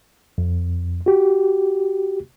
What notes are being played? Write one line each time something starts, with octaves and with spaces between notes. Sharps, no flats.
F2
F#4 G4